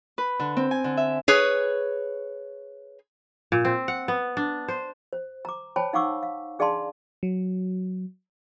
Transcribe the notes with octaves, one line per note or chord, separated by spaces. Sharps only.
B4
D3
C4
G#5
D3
E5
G#4 B4 C#5
A#2
C4
F#5
B3
D4
C5
C5
A#5 D6
C5 C#5 G5 A5 B5
D#4 F5 F#5 C#6 D6 E6
F5
D4 G#4 D5 F5 A5 C6
F#3